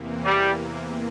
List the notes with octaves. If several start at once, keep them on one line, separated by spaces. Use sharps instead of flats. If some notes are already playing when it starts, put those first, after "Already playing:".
Already playing: E2 C3 E3 A#3
G3